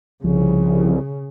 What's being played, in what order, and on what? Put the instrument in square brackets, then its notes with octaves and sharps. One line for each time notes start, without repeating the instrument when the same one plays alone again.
[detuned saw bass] C2 [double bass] C#3 [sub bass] F3